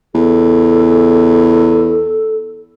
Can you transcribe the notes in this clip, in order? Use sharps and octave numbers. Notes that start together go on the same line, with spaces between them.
E2 A4